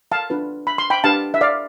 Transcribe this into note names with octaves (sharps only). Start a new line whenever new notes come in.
F5 A5
D4 F4 B4
B5
C6
G5 B5
D4 G4 B4 F5 A5
E5
D5 F5